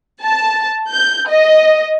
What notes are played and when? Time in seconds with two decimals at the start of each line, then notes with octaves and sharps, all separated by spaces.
0.23 A5
0.90 G6
1.28 D#5